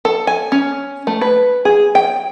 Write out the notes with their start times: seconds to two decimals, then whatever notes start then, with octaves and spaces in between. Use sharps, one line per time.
0.05 A4
0.27 G#5
0.52 C#4
1.07 A3
1.21 B4
1.65 G#4
1.95 G5